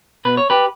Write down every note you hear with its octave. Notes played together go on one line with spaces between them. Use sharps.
B2 B4
C#5
G4 B4